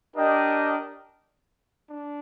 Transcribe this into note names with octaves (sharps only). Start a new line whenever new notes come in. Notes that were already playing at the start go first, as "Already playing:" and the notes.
D4 G4 A#4 D#5 G5
D4